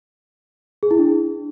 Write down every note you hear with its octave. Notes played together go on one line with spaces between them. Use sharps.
G#4
E4
D4